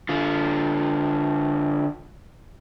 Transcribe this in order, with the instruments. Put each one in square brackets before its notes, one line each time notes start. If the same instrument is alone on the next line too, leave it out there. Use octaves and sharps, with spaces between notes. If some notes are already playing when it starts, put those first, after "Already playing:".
[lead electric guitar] D3 F4